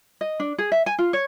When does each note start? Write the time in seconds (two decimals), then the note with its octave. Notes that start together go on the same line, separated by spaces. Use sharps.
0.21 D#5
0.40 D4
0.58 G#4
0.72 E5
0.86 G#5
0.98 F4
1.13 C#5